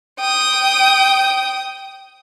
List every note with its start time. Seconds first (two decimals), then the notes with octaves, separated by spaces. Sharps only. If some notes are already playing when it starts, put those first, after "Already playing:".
0.19 G5 D#6